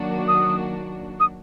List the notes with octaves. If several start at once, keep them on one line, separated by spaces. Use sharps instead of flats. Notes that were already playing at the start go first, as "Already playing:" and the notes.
Already playing: D#3 F#3 A#3 D4 F#4
D#6
D#6